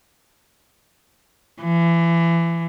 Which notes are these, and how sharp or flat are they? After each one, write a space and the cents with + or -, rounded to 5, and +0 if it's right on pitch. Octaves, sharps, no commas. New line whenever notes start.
E3 +30